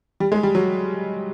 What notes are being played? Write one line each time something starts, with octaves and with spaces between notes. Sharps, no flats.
G3
G#3
G3
F#3